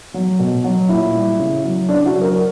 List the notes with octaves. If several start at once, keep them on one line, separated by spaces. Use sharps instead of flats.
F#3
B2
F#3
A#2 E4
G3
C#3
F#3
C#3 D4
F#4
F#3
A#4